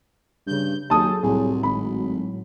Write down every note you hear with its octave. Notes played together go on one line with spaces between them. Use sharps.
G2 C#3 G6
D#2 F#3 G#4 A4 A5 D#6
C2 A2 F#3 G#4
G#1 B5